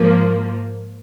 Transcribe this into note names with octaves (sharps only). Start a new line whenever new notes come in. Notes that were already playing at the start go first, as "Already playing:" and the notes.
Already playing: G#2 F3 A#3